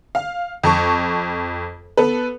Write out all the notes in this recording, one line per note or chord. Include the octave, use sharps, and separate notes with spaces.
F5
F2 A5 C#6
B3 A4 B4